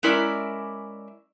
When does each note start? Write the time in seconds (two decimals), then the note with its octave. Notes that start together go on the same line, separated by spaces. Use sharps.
0.03 G#3 C#4 E4 A#4 D5 E5